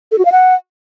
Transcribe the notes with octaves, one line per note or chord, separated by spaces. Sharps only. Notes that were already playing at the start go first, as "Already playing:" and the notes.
A4
F#4
F5
F#5